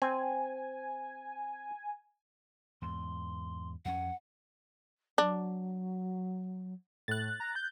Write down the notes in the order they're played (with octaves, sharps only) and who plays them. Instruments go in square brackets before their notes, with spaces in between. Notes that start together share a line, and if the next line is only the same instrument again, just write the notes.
[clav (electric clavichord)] C4 [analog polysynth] G#5
[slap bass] E2 G#2 [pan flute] C6
[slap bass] F2 C#4 [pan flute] F#5
[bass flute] F#3 [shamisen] D4
[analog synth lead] A2 [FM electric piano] F#6 A6
[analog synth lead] A#5
G6